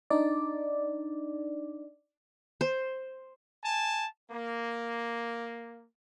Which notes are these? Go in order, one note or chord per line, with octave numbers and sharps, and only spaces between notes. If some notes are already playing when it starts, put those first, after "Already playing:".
D4 D#4 D5
C5
G#5 A5
A#3